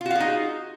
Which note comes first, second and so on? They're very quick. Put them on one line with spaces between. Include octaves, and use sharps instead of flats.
F4 F#4 F5 G#4 D#4